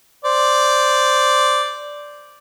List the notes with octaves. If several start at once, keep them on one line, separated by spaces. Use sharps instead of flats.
C5 D5